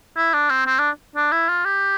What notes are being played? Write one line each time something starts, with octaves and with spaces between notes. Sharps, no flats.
E4
D4
C4
C4
D4
D4
E4
F4
G4